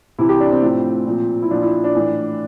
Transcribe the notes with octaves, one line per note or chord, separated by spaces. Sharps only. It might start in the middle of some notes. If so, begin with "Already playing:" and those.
C3 E3 E4
G4
D4
C4
A2 F3
A#2 F3
E4
A#2 F3 D4
E4
D4
A2 E3